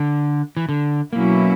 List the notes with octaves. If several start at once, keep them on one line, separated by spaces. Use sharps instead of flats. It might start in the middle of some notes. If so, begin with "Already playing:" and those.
Already playing: D3
E3
D3
B2 F#3 A#3 C#4 E4